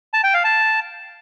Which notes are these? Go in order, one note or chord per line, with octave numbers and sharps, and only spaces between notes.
A5
G5
F5
A5